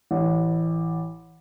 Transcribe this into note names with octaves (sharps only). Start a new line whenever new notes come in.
A1